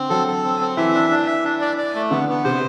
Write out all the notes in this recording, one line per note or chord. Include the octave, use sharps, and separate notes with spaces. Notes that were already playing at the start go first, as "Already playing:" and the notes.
Already playing: D3 C4
F#3 A4
A4
C4
C4
E3 E5
D4
D4
E5
D4
D5
D5
A3
D3 B3
B3
C3 C5